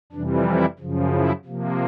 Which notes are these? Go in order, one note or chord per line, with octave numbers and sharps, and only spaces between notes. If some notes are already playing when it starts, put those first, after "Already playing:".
F2 C3 E3 G3 D4
E4
F#2 C#3 F3
E4
C3 F3 A#3